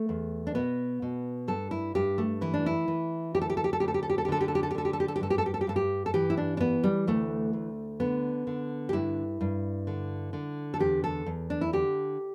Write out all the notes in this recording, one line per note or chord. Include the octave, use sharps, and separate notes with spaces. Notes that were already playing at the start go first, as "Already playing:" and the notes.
Already playing: A3
E2
D4
B2 B3
B2
G2 A4
E4
G2 G4
A3
E3 E4
D4
E4
E3
D2 G4
A4
G4
A4
G4
A4
D2 G4
A4
G4
A4
G4
A4
G4
D3 A4
G4
A4
G4
A4
G4
D3 A4
G4
A4
G4
A4
G4
G2 A4
G4
A4
G4
A4
G4
G2 A4
G4
A4
E3 G4
E4
D4
D4
E3 B3
G3
D2 A3
D2
D3 B3
D3
G4
G2 E4
G2
D3
D3
A4
E2 G4
A4
E2
D4
E4
D3 G4